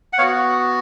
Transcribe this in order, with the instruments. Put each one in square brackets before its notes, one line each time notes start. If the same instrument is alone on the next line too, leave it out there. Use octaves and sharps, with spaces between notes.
[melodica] F#5
B3 F#4 C#5 F5